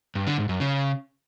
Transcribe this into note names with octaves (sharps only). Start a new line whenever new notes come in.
G2
D3
G#2
F#2
C#3